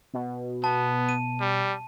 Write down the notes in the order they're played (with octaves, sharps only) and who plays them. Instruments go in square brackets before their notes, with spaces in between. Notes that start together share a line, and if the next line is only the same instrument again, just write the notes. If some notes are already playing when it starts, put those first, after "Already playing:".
[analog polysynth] B2
[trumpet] B3 [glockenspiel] A5
[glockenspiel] D#7
[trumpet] G3